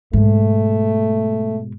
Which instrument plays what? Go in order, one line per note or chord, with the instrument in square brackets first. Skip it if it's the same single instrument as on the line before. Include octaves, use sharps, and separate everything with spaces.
[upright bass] G#2 B2 [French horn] A3